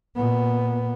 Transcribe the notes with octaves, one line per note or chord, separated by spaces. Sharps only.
A#2 B3